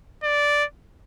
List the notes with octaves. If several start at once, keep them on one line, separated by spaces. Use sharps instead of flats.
D5